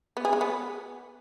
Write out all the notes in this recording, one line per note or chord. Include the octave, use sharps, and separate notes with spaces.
B3
G#4
G#3
B3